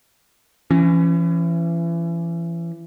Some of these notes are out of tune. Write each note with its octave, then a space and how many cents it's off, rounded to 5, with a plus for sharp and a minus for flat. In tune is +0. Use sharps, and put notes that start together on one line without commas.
E3 +35 C#4 +0